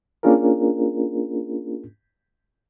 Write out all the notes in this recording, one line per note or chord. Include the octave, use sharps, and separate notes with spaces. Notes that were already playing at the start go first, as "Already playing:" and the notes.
A#3 C#4 D4 F4 G#4 A#4